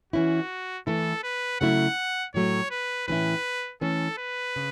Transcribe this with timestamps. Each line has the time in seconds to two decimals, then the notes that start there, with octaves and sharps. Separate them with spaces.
0.13 E3 C#4 E4 F#4
0.87 E3 A3 E4 A4
1.23 B4
1.61 C#3 F#3 A3 E4 F#5
2.34 A2 F#3 A3 C#5
2.71 B4
3.07 A2 E3 C#4 E4 B4
3.81 E3 A3 C#4 A4
4.18 B4
4.56 C#3